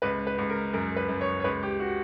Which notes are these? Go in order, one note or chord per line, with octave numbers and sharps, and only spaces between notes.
C#2 B4
B4
C#2
A#4
F#2 A#4
B4
F#2
C#5
C#5
C#2 B4
G4
F#4